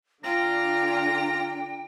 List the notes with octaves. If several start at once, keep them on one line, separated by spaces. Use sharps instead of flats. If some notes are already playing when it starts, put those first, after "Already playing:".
D3 D4 F4 G5 A#5